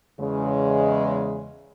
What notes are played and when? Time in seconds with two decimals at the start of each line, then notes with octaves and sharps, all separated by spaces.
0.20 E2 C#3 G#3